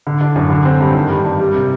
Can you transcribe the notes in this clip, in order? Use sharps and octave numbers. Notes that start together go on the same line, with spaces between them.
D3
D4
F#2
D3
C4
G2
D#3
G2
G2
G3
C3